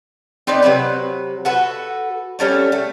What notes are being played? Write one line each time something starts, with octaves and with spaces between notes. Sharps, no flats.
C4 D#4 B4 D5
C3 F3 F#3 B4
F#4 A4 B4
G3 C#4 A4 C#5
A3